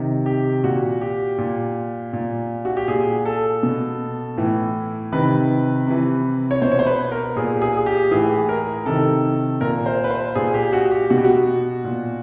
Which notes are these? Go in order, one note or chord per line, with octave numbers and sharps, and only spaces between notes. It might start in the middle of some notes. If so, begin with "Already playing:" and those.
Already playing: C3 D#3
G4
A#2 F#4
G4
A#2
A#2
F#4
G4
A#2 G#4
A4
B2
A2 E3
C3 D#3 B4
C3 E3
C#5
B2 C5
C#5
C5
B4
A#4
A#2 G#4
G4
G#4
G#4
G4
A2 E3 G#4
A#4
C3 D#3 A4
A#2 A#4
C5
B4
C5
A#2 G#4
G4
F#4
G4
B2 F#4
G4
F#4
A#2